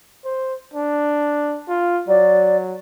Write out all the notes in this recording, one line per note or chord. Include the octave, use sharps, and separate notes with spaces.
C5
D4
F4
F#3 D5